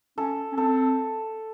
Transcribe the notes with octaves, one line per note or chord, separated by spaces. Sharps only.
C#4 A4
C#4
C4 A4